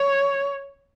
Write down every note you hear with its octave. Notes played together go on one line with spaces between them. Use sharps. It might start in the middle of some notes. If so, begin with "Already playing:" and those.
Already playing: C#5